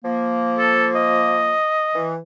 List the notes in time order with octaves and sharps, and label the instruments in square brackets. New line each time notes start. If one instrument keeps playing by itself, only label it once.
[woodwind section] F3 A#3
[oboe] A4
D#5
[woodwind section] E3